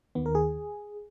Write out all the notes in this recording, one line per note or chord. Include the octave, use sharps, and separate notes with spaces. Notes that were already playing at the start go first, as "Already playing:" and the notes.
D#2 D#3 B3
A#4
G#4